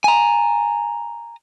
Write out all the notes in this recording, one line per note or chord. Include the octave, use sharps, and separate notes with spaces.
G#5 A#5